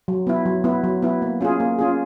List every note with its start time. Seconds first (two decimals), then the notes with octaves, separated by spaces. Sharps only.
0.08 F#3
0.27 B3 E4
0.45 F#3
0.64 B3 E4
0.84 F#3
1.02 B3 E4
1.22 A#3
1.41 C#4 F4 G#4
1.60 A#3
1.79 C#4 F4 G#4